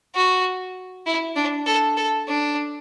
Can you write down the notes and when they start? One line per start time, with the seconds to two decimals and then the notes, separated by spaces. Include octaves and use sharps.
0.15 F#4
1.06 E4
1.36 D4
1.66 A4
1.97 A4
2.28 D4